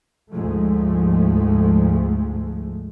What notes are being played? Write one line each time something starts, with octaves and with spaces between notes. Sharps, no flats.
D2 G#2 F3 G#3 A3